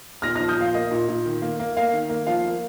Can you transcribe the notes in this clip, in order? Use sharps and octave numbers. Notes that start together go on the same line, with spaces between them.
A#2 F6 A#6
F6 A#6
F3
D#6 G6
A#2 F5
A#3 D#5
A#2
A#2
D#3
A#3
A#3
A#3 F5
D#3
A#3
F3 F5
A#3